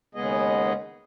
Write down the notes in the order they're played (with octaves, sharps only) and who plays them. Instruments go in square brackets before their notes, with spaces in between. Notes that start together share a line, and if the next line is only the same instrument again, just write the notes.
[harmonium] D#2 C#3 G#3 B3 G#4 D#5